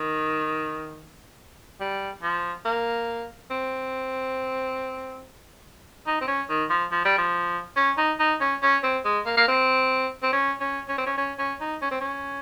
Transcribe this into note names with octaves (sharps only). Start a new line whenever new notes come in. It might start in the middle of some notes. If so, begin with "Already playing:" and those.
Already playing: D#3
G3
F3
A#3
C4
D#4
C4
C#4
D#3
F3
F3
G3
F3
C#4
D#4
D#4
C#4
C#4
C4
G#3
A#3
A#3
C4
C4
C#4
C#4
C#4
C4
C#4
C#4
C#4
D#4
C#4
C4
C#4